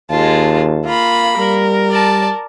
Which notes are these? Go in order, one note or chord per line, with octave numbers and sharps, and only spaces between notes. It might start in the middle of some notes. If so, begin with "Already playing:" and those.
D#2 G#3 F4 A5
A#3 F4 B5
G3 A#4
D5 A5